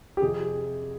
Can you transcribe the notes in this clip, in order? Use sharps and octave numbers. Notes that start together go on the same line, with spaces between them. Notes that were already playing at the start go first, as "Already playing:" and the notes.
G4
F2 C3 F3 G#4